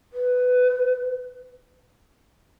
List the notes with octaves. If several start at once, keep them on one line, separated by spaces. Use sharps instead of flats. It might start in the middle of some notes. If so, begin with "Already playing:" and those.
B4